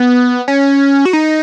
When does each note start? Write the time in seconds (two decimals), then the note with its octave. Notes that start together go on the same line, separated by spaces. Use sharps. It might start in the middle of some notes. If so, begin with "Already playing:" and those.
Already playing: B3
0.48 C#4
1.05 F#4
1.13 D#4